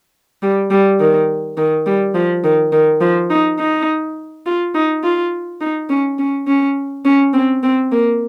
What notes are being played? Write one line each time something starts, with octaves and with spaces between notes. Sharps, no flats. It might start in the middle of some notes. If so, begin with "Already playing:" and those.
G3
G3
D#3
D#3
G3
F3
D#3
D#3
F3
D#4
D#4
F4
D#4
F4
D#4
C#4
C#4
C#4
C#4
C4
C4
A#3